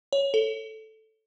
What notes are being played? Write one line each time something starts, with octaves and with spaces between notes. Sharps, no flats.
C#5
A4